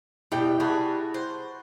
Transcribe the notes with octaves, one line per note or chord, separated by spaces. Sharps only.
B2 G3 E4 D#5 G5
G3 F#4 G#4 B4 A5
C5